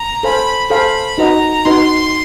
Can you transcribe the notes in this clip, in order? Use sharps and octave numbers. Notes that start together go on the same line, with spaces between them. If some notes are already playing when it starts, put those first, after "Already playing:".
Already playing: A#5
A4 C5 F5 G#5 B5
A4 C5 F5 G#5 B5
D#4 F#4 B4 D#5 A#5
D#4 F#4 B4 D#5 C6